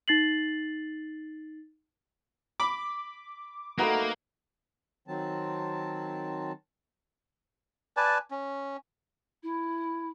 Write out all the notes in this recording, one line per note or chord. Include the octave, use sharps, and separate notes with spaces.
D#4 A6 C7 F#7
B5 D6
A3 A#3 D#4 F#4 B4 F#5
D#3 F#3 C4 A5
B4 D5 G#5 A5
C#4
E4